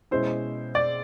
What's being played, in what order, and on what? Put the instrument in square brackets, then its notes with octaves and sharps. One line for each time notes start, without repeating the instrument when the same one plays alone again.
[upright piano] B2 G#3 C#4 E4 [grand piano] C5
[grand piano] D5